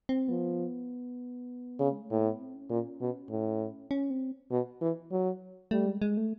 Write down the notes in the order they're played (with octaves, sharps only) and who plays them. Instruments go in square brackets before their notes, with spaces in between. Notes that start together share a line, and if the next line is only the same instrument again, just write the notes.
[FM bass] C4
[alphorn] F3 [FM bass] B3
[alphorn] C#3
[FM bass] G#3
A3
[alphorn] A2 [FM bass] A#3
[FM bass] B3
C4
C#4
[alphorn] A#2
B2
A2
[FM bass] C#4
C4
[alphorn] B2
E3
F#3
[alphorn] G3 [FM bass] A3
[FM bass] G#3
G#3
A3